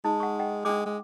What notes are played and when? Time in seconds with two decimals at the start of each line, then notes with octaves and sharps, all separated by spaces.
0.05 G#3 D#4
0.20 F#5 C#6
0.39 D#5 F#5 G5
0.65 G#3 D4 G5 D6
0.86 G#3